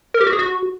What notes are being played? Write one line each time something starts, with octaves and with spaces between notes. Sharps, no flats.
A#4
G4
F#4
G#4
F#4